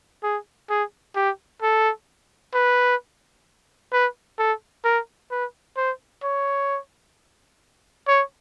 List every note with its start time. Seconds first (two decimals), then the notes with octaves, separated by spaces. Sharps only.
0.23 G#4
0.69 G#4
1.16 G4
1.62 A4
2.54 B4
3.92 B4
4.38 A4
4.84 A#4
5.31 B4
5.77 C5
6.23 C#5
8.08 C#5